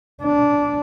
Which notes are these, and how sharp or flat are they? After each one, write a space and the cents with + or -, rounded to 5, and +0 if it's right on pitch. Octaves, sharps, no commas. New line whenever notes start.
D4 -15